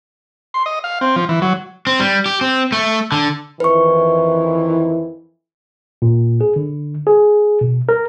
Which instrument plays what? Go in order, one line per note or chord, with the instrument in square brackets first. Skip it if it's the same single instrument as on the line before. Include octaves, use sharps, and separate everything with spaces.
[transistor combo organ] C6
D#5
F5
C4
F3
E3
F#3
[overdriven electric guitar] C4
G3
G4
C4
A3
D3
[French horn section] F2 D#3 E3 [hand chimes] B4 C#6
[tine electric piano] A#2
G#4
D3
G#4
B2
A#4